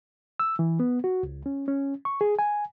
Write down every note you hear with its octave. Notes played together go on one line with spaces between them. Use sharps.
E6
E3
B3
F#4
C#2
C#4
C#4
C#6
G#4
G#5